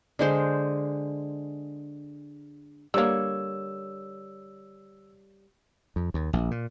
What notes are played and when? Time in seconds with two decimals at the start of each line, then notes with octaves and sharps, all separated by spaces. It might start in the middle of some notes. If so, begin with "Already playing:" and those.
0.19 D3 G#3 C5
2.94 D3 G3 A#3 C#5 E6
5.96 F2
6.14 D#2
6.33 A#1
6.51 A#2